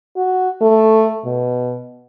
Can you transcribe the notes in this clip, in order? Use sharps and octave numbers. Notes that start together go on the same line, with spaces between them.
F#4
A3
B2